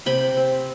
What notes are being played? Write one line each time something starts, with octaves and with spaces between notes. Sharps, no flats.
C3 G5 B5
C4